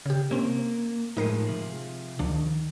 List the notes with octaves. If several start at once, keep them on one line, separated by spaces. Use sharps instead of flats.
C#3 G4
C3 A#3 C4 C#4
A2 F3 G#3 D#4 A#4 C7
C3 F3 G#4
D2 D#3 F3 D4